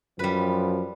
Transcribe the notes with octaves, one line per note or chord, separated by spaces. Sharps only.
F#2 F3 G3 B4